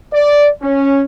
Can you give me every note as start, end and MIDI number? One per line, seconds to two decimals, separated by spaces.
0.13 0.48 74
0.62 1.03 61